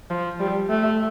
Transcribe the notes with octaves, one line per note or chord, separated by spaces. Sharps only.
F3
G3
A3